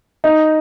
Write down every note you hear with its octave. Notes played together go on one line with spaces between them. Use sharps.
D#4